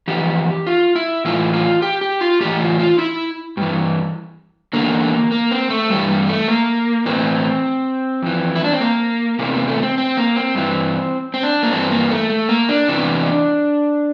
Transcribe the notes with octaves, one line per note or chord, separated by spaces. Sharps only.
F2 E3 G4
F4
E4
A2 E3 F4
F4
G4
G4
F4
A2 E3 G4
F4
F4
E4
G2 E3
E2 D3 A#3
A#3
C4
A3
G2 E3 G3
G3
A3
A#3
A2 E3 C4
F2 E3
E4
D4
C4
A#3
E2 C3 E3 A#3
A#3
A3
C4
C4
A#3
C4
G2 E3
C4
D4
A#3
G2 E3 C4
A#3
A3
A3
A#3
D4
E2 C3 E3